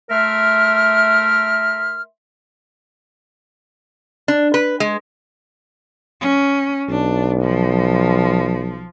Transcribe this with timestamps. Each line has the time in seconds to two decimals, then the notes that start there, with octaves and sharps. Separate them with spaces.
0.10 A3 A#4 E5 C6 F6
4.28 D4
4.54 B4
4.80 G#3
6.21 C#4
6.89 B1 D4
7.42 F3